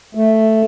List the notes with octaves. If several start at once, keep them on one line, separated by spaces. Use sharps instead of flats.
A3